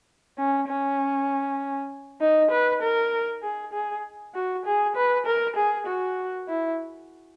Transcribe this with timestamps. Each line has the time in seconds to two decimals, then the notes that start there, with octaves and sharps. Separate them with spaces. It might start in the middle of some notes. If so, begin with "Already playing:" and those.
0.38 C#4
0.68 C#4
2.21 D#4
2.51 B4
2.82 A#4
3.43 G#4
3.73 G#4
4.35 F#4
4.66 G#4
4.96 B4
5.26 A#4
5.56 G#4
5.87 F#4
6.48 E4